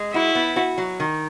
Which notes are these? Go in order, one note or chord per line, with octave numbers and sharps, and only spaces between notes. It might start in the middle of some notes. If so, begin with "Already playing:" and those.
Already playing: G#3
E4 F#4
B3
F#4
F#3
D#3